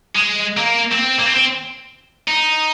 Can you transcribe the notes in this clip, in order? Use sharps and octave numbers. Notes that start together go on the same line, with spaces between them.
G#3
A#3
C4
A#3
C4
C4
D#4